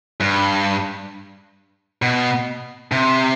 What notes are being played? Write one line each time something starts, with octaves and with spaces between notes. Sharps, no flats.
G2
B2
C3